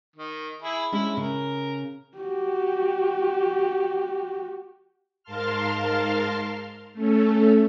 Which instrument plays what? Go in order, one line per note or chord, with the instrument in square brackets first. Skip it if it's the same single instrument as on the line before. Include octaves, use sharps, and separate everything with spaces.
[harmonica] D#3
E4 G#4
[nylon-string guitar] G#3 C#4 D4 [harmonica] E4
[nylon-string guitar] C#3 [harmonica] A#4
[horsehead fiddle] F#4 G4
[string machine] G#2 A#4 F5 A5 C6 F6
A3 C#4 A4